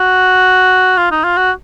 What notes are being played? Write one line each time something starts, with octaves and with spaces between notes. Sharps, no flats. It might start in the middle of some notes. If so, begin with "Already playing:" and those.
Already playing: F#4
F4
D#4
F4
F#4